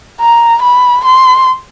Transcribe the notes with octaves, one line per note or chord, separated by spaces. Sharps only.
A#5
B5
C6